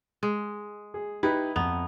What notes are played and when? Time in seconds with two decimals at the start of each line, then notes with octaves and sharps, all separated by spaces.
0.23 G#3
0.94 G#4
1.23 D#4 E4 G4 B4
1.56 F2 B3 A#5 F7